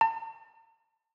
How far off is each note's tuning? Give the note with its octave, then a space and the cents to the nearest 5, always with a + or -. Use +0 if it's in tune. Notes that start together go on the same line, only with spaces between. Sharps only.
A5 +40